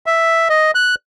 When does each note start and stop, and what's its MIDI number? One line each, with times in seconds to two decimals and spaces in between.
0.06 0.48 76
0.50 0.71 75
0.75 0.95 90